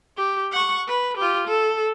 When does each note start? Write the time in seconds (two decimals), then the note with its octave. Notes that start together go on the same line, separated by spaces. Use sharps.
0.17 G4
0.52 F#5 C#6
0.88 B4
1.18 F4 G4
1.48 A4